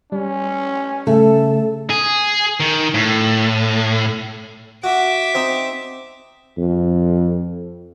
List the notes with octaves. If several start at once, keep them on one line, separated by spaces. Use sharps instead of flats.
G3 C#4
C#3 A3 A4
G#4
D#3
A2
F#4 E5 D6
C4 D#4
F2